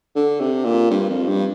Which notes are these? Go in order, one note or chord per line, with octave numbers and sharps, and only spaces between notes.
D3
C3
A#2
G2
F2
G2